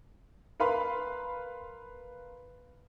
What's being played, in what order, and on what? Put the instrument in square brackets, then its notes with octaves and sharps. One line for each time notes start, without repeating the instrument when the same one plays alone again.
[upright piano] A#4 B4 F5 B5 C6